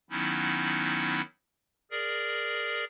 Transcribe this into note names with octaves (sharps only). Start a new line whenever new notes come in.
D#3 F#3 B3 C#4 D#4 E4
G#4 A#4 D5